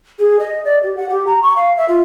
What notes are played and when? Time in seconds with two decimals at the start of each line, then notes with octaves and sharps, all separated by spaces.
0.19 G#4
0.39 D#5
0.65 D5
0.83 G4
0.97 F#5
1.09 G4
1.26 A#5
1.42 C#6
1.56 F5
1.77 E5
1.89 F4